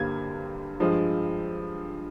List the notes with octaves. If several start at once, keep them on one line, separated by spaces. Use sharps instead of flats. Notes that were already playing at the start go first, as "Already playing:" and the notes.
Already playing: G2 D3 G3 A#3 G#6
G2 F3 G#3